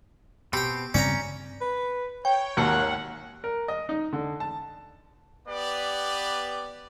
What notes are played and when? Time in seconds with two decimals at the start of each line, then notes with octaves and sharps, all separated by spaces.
0.53 B2 C4 G4 G5
0.94 G2 C#3 C4 C#4 D5 G5 A#5
1.61 B4
2.25 C#5 G5
2.57 G#1 D#2 A#3 F#5
3.44 A#4
3.68 D#5
3.89 D#4
4.13 D3
4.40 A5
5.48 B3 G4 B4 D5